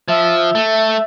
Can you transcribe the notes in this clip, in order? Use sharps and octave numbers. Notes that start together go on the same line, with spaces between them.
F3 E5
A3